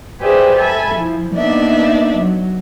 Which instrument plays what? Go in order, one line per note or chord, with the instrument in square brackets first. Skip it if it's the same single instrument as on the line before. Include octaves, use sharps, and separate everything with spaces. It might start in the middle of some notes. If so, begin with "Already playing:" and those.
[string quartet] G4 G#4 B4 C5 D5 E5
A4 E5 G#5 B5
F3 E4
A#3 B3 D4 D#4 D5 E5
F#3